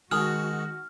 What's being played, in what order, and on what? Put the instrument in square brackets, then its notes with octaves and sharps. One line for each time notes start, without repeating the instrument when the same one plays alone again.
[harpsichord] D#3 G#3 [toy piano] D#4 G#5 D#6 [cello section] F#4 [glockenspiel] F6